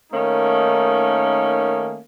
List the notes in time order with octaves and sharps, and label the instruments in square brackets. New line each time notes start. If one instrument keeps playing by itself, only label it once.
[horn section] D#3 A3 A#3 C#4 D#4